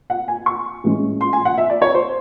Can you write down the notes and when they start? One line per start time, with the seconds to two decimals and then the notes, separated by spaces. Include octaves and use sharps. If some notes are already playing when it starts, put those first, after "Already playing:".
0.10 F#5
0.28 G#5
0.46 C#6
0.84 A2 E3 G#3 C#4
1.21 C6
1.33 G#5
1.45 F#5
1.58 E5
1.70 D5
1.82 C#5
1.95 C5